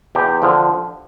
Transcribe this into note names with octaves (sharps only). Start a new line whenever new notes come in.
E2 G4
D3 F3